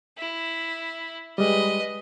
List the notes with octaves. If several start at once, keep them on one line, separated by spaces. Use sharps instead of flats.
E4
G3 G#3 B4 D#5